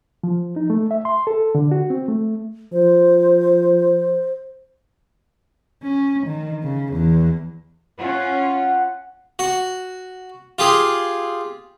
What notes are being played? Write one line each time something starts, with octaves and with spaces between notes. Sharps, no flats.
F3
D#4
A3
E5
C6
A4
D3
F#4
C4
A3
F3 C5
C#4
D#3
C#3
E2
C#4 F4 F#5
F#4
F4 G4 G#4